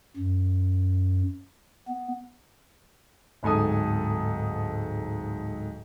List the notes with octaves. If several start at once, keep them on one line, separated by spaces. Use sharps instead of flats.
F#2
B3
D1 G#2 A4 G#5 D#6